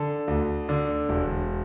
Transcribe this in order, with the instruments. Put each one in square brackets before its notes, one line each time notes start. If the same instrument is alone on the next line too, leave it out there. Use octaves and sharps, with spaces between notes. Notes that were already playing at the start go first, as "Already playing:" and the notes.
Already playing: [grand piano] D3 A4
D2
D3
E1